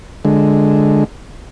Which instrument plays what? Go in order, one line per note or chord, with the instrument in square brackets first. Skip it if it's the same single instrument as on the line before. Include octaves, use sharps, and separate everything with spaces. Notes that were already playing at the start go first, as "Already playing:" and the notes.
[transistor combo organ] D3 G#3